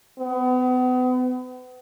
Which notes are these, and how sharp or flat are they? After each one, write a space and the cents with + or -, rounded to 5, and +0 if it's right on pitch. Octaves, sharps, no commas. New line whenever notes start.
B3 +35